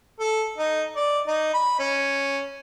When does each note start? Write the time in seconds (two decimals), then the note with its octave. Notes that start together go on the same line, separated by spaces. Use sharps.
0.20 A4
0.58 D#4
0.96 D5
1.27 D#4
1.54 B5
1.79 C#4